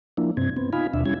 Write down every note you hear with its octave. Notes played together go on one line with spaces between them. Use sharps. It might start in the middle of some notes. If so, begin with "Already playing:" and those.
F3 A#3 D4 E4
G2 C3 C4 G#6
B3 C4
D#4 F4 F5 G#5 B5
D#2 B2 D4 E5
G3 C#4 E4 G#6